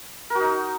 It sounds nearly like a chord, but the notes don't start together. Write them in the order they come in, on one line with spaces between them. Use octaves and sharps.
A#4 F#4 D#4